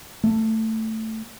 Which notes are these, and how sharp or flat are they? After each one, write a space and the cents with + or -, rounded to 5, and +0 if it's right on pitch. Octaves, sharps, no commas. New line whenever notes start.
A3 +10